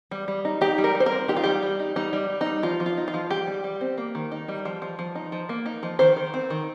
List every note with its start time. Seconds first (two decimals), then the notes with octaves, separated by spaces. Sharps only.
0.11 G3
0.28 G3
0.45 D#4
0.61 D#4 G4
0.78 G3
0.84 A#4
0.95 G3
1.00 C5
1.06 A#4
1.12 C4
1.28 D#4 G4
1.36 F4
1.44 G3 G4
1.62 G3
1.79 D#4
1.96 G3 D#4
2.13 G3
2.30 G3
2.41 D#4
2.46 G3
2.63 F3 F4
2.80 F3
2.86 F4
2.97 D#4
3.08 F4
3.14 F3
3.30 G3 G4
3.47 G3
3.64 G3
3.81 C4
3.98 A#3
4.15 D#3
4.32 D#4
4.48 G3
4.65 F3
4.82 F3
4.99 F3
5.15 D#4
5.32 F3
5.49 A#3
5.66 D#4
5.83 F3
5.99 D#3 C5
6.16 D#3
6.34 C4
6.50 D#3